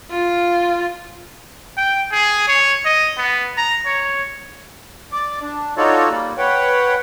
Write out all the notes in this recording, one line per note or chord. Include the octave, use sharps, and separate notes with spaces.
F4
G5
G#4
C#5
D#5
B3
A#5
C#5
D5 D6
D4
D#4 F4 F#4 A4 C#5 D5
G3 A#3
B4 C#5 F#5 G5